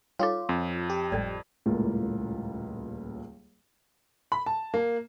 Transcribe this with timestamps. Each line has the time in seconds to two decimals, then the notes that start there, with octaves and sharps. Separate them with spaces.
0.19 G3 D#4 F4 A4 C#5 F5 D6
0.49 F2 C4
0.90 G4
1.12 G#1 A2 G3 D5
1.66 D#1 C#2 A2 A#3 F4
4.32 B5
4.46 A5
4.74 A#3